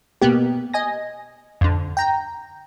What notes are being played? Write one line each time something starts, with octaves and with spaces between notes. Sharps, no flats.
B2 A#3 B3 G4
D#5 G#5 A#6
F2 D3
G5 A#5